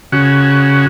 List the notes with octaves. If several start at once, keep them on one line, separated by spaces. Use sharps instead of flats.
C#3 F#4